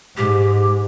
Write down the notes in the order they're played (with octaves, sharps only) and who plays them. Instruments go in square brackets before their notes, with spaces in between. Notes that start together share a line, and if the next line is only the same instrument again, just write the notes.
[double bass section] G#2 [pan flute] G4